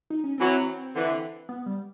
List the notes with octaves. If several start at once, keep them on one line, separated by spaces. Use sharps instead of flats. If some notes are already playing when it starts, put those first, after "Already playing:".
D#4
C#4
E3 F#3 C4
D3 E3
B3
G3